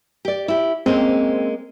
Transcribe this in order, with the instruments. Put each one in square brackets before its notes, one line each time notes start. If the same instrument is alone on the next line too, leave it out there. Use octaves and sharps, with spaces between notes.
[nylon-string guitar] G4 D5
E4 G4
[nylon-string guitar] G#3 A#3 C#4 [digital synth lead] C4